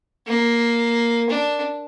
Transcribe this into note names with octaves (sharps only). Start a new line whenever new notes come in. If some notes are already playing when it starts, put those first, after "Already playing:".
A#3
D4